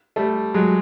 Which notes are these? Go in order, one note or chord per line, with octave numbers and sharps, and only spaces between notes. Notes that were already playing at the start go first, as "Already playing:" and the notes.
G3 A3
F#3 G#3